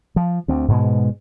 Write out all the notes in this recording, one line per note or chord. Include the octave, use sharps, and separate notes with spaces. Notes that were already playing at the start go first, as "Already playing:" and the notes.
F3
D2 C4
G#2 B2 G#3